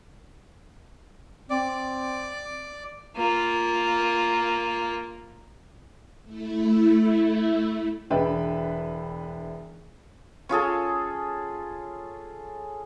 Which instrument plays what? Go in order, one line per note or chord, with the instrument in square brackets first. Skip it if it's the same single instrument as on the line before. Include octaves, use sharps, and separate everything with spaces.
[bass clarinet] C4 [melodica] D5
[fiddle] A#3 F4
[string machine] A3 E4
[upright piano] E1 D4 B4 E5 G5
[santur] C#4 F4 G#4 A4